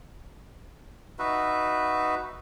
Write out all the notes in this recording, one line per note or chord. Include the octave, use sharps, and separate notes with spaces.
D#4 F#4 B4 E5